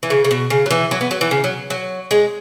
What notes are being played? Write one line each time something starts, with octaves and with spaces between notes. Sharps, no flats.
E3
C#3
C#3
B2
C#3
F#3
E3
F#3
B3
F#3
E3
C#3
F#3
F#3
G#3